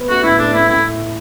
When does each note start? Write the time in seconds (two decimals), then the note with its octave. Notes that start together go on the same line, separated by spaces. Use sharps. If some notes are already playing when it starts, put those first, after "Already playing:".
Already playing: B3
0.09 A3 F#4
0.24 A2 E4
0.39 A3 D4
0.53 A3 E4
0.69 A2 E4